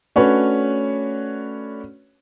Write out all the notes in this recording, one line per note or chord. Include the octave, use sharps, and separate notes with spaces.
A3 C#4 D4 F#4 B4 C#5